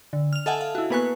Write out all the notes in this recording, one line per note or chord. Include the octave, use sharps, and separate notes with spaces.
D3
F6 F7
A4 D#5 E5 F#5 G#5 A5
F5
E4 F#4
A#3 B3 B4 G#5 C#6 F#6